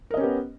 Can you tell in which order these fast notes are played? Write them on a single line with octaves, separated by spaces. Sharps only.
A#4 D#5 C#4 G4 B3